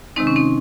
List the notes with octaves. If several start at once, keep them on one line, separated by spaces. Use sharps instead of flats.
C3 D#3 G#3 C4 D#4
C#4
C4 D#4